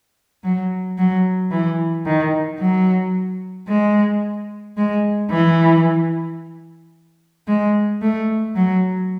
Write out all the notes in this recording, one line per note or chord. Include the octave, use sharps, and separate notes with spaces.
F#3
F#3
E3
D#3
F#3
G#3
G#3
E3
G#3
A3
F#3